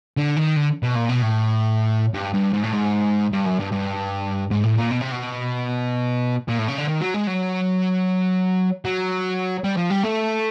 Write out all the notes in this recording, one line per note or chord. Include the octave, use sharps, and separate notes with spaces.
D3
D#3
D3
B2
A#2
B2
A2
G2
G2
G#2
A2
G#2
G2
F#2
G2
G2
G#2
A2
A#2
B2
C3
B2
A#2
A2
C#3
D3
D#3
F#3
G#3
F#3
F#3
G3
F3
G3
A3